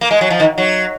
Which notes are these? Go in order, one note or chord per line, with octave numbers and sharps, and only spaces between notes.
A#3
G#3
F#3
F3
D#3
F#3